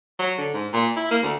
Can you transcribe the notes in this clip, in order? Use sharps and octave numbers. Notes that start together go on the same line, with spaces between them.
F#3
D3
G#2
A#2
E4
A#3
D2